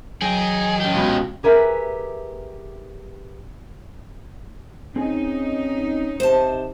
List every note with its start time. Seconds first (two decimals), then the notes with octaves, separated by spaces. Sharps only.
0.22 F#3 G#4 D#5 G5
0.80 C#4 G4
0.93 C#2 B2 B5
1.43 G4 G#4 A#4 B4 E5
4.96 C4 C#4 D#4 G#4 G#5
6.20 C3 C5 A5